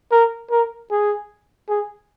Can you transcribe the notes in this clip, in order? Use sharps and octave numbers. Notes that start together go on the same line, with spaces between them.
A#4
A#4
G#4
G#4